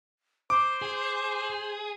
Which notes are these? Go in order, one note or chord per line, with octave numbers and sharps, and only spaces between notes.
C5 D6
G#4